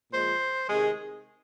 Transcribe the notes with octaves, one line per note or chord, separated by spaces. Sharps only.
A#2 F3 G#3 C5
C3 D#3 G#3